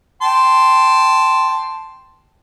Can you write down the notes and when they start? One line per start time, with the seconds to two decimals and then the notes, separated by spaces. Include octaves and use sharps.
0.22 G5 A5 C6